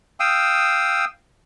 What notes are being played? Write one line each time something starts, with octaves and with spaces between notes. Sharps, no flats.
F5 G5 D#6 E6